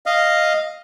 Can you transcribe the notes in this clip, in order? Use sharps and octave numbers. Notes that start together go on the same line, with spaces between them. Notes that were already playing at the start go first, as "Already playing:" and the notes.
D#5 F5